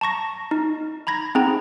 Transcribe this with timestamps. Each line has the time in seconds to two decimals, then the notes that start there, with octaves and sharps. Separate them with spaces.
0.01 A5 A#5 C#6 A#6
0.51 D#4
1.07 A#5 B5 G#6 A#6
1.35 C4 D#4 G#4 F#5 A#5